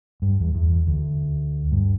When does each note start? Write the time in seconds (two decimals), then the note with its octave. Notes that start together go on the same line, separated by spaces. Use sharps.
0.22 G2
0.40 E2
0.55 E2
0.87 D2
1.72 G2